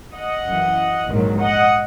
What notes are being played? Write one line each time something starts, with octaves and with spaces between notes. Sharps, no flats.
D#5 F#5
F#2
E3
A#1 G#2 D#3 F#3
D#5 F#5